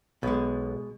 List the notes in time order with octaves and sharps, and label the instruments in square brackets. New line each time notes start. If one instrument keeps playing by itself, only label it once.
[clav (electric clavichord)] B1 [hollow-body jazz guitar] B2 G#3